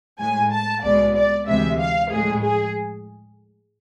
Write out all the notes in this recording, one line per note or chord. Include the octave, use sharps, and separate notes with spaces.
A2 G#3 G#5
A5
C2 B2 G#3 D5
D5
D2 C3 E3 G#3 E5
F5
A2 F3 G#3 G#4
G#4